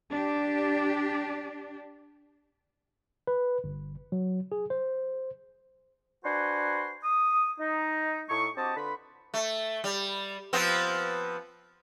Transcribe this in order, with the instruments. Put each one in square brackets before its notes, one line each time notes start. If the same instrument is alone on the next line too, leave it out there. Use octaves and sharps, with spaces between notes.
[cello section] D4 G4
[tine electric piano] B4
G1
F#3
G#4
C5
[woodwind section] D4 F#4 B4 C5 G#5 C6
D#6
D#4
A2 A3 D#4 C#6
C4 D4 F#4 G4 D#5 A5
D3 F4 B4 B5
[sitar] A3
G3
F3 B3 C4